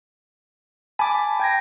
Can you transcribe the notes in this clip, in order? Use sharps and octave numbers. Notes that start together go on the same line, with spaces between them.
G#5 A5 B5 D6
G5 G#6 A#6